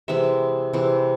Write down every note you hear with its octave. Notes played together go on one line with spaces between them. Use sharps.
C3 E3 G#3 E5
C3 E3 G#3